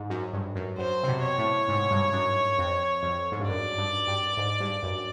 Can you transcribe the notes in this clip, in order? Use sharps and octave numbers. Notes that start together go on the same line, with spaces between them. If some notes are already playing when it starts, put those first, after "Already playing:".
Already playing: G#2
F#2
G2
F#2
F#2 C5
C3
B2
C#5
A2
G#2
G2
F#2
F2
F2
G#2
G2
F#2 D5
G2
G2
G#2
G2
F#2